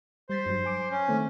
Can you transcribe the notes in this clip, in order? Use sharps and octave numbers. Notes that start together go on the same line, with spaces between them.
G3 C5 A6 B6
G2 F#3
G#5 D6
C#4
D#3 A3 C4